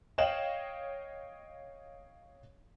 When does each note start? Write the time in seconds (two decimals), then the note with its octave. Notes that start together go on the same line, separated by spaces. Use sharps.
0.18 C#5 D#5 F5 G5 E7 F#7